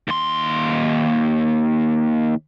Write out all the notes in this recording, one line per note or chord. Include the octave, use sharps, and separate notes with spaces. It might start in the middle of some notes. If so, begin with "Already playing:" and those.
D#2 C6